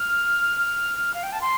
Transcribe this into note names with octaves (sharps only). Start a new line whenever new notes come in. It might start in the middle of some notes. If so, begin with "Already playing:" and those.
Already playing: F6
F5
G5
A5
C6